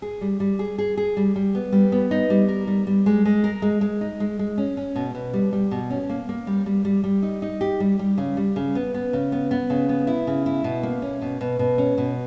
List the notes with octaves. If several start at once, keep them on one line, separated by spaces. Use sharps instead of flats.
G#4
G3
G3
G#4
G#4
G#4
G3
G3
B3
G3
B3
D#4
G3
A#4
G3
G3
G#3
G#3
A#4
G#3
G#3
D#4
G#3
G#3
C#4
C#4
B2
B2
G3
G3
B2
C#4
A#3
A#3
G3
G3
G3
G3
D#4
D#4
G4
G3
G3
C#3
G3
C#3
B3
B3
C#3
B3
B3
C#3
B3
E4
C#3
E4
B2
A#3
C#4
B2
B2
B2
C#4
B2